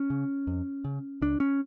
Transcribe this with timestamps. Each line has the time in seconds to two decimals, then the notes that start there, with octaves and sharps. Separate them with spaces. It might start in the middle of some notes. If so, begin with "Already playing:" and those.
Already playing: C#4
0.10 C#3
0.47 F2
0.85 C#3
1.22 C#2 D4
1.40 C#4